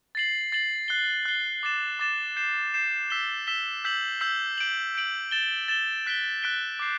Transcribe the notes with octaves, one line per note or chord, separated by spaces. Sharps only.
A6 C7 F#7
A6 C7 F#7
F#6 C7 G7
F#6 C7 G7
D6 A6 E7
D6 A6 E7
G6 C7 E7
G6 C7 E7
E6 B6 E7 G7
E6 B6 E7 G7
E6 G6 B6 F#7
E6 G6 B6 F#7
G6 D7 F#7
G6 D7 F#7
A6 E7 G7
A6 E7 G7
F#6 B6 D7 G7
F#6 B6 D7 G7
D6 G6 C7